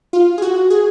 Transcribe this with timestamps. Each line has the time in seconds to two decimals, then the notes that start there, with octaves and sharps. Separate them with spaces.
0.13 F4
0.38 G#4
0.42 F#4
0.70 G#4